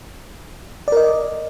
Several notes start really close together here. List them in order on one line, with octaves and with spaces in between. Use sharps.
D5 A#4 D#5